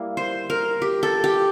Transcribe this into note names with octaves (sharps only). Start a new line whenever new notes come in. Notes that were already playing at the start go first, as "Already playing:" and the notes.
Already playing: G3 A#3 E4
C5
A#4
G4
A4
G4